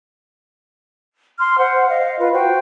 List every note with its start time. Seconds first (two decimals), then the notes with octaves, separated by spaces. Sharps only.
1.38 C6 F6
1.58 C5 F#5
1.89 D#5 F5
2.20 F4 B4
2.33 F#4 C5 G5